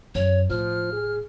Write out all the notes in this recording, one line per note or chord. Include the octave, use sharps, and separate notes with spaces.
F#2 C#5
A2 F3 F6
G#4